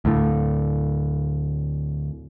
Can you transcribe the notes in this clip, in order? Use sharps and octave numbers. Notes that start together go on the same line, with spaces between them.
D2 A2